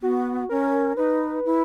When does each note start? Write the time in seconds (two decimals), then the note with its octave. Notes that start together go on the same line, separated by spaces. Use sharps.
0.02 B3 F#4
0.49 C#4 A#4
0.97 D#4 B4
1.45 E4